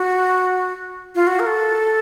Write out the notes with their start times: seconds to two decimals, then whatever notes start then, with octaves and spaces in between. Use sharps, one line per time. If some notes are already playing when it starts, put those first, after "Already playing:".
Already playing: F#4
1.15 F4
1.27 F#4
1.39 A#4
1.46 A4